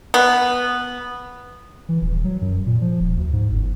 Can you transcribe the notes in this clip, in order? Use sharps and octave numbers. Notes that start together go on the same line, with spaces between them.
B3
E3
D#1
F#3
F#2
A#2
F3
D#1
D2
G#2
G1